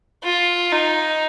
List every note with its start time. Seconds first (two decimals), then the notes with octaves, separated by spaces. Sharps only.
0.24 F4
0.72 D#4